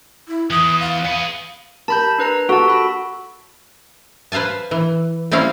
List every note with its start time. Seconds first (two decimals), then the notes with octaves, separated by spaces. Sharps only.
0.28 E4
0.50 E2 E3 D#6
0.80 F5
1.05 B3 G#4
1.88 A#4 A5 B5 G6
2.18 D4 B4 A#5
2.49 F#4 A4 A5
2.68 A4 B5
4.32 B4 C5 F5 G#5 A5
4.71 E3
5.31 G3 C4 C#4 E4 F5